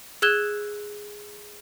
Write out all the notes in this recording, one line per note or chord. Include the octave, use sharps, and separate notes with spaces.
G#4 E6 F#6 G#6 E7 G7